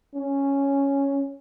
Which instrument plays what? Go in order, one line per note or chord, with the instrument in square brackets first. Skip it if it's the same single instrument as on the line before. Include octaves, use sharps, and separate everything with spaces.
[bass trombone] C#4